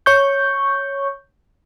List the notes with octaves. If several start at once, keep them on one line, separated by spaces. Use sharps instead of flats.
C#5 C#6 G6